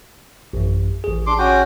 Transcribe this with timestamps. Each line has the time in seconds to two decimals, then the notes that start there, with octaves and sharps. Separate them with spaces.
0.53 A1 F#2
1.04 A1 G#4
1.27 D4 C6 D6
1.39 C#4 F#4 G5